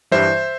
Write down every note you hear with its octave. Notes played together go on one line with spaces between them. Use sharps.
G2 E3 G3 C5 E5